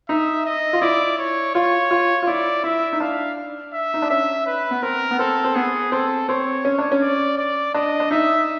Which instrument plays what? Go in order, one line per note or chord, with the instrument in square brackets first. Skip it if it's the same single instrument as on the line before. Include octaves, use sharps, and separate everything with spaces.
[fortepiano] D#4 [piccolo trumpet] E5
[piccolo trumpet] D#5
[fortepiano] F4
[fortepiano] E4 [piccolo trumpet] D5
[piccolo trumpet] C#5
[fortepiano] F4 [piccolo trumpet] C#5
[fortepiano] F4
F4
[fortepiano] E4 [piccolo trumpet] D5
[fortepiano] E4 [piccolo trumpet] E5
[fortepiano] D#4
[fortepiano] D4 [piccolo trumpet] F5
[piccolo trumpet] E5
[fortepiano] D#4
D4
[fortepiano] C#4 [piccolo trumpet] E5
[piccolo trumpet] B4
[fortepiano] B3
[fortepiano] C4 [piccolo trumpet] A#4
[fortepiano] B3
[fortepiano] C4 [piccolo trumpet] A4
[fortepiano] C4
[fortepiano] B3 [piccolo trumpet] G#4
[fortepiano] C4 [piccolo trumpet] A4
[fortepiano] C4 [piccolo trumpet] C#5
[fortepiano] C#4
D4
C#4
[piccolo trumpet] D5
D5
[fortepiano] D4 [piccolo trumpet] D#5
[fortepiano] D4
[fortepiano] D#4 [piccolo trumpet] E5